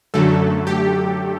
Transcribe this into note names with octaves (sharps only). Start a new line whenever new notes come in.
F#2 D3 F#3 A3 A4
G4